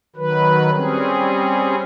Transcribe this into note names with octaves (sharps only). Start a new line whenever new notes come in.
D#3 F#3 B4
G3 C4 C#4 G#4